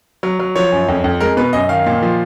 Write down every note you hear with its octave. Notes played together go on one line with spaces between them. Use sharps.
F#3
F#3
F3 C#5
F#2
F2
F2
G#3 A#4
B2 B4
F#2 D#5
D#3 F5
A#2
F3